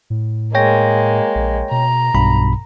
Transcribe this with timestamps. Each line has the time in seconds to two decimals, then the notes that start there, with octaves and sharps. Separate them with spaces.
0.10 A2
0.55 G#3 A#3 C#5 G5 A#6
1.35 A#1
1.71 B2 A#5
2.14 B1 G2 B2 B5